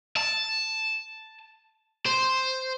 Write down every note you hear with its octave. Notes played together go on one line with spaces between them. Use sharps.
A5
C5